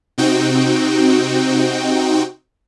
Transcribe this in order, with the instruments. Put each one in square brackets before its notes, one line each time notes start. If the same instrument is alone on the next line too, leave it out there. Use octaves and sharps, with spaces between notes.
[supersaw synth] C3 C4 D#4 F#4 G5